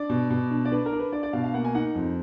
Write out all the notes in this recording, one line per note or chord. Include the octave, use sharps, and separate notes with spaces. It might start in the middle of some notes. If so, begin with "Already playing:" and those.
Already playing: D4 D5
B2
B2
D4
D5
D4 B4
A#4
D4
B4
D4 D5
D5
B2 F5
F5
A#3 F#5
G#5
D#4 F#5
F2